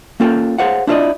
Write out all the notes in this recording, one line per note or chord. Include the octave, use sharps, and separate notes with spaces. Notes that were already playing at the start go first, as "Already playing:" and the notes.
A#3 C#4 F4 A4 G5
G#4 C5 C#5 F5 F#5
D4 E4 F4 C5 D5 D#5